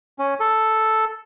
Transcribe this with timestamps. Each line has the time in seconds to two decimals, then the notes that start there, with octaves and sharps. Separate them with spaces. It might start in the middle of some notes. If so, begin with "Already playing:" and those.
0.19 C#4
0.40 A4